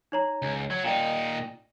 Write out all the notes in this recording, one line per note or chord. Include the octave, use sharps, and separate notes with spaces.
D#4 C#5 A#5
C#2
F#3 G#6
A#2 D#4 D5 G5 E7